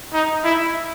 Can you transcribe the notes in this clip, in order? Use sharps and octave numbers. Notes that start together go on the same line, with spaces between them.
D#4
E4